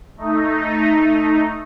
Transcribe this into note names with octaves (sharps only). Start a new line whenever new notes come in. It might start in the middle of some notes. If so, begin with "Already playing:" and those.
A3 D#4